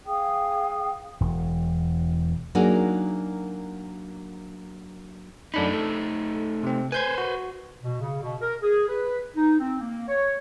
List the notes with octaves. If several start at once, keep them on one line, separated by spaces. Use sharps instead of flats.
G#4 F5 G5 D#6
E1
F#3 A#3 D4 D#4 G#4 A#4
F#2 A3 D4 D#4 B5
A4
C3 C4
B4 C5 G#5 G6 G#6
F#4
B2
C#3
B2
A#4
G#4
B4
D#4
C4
A#3
C#5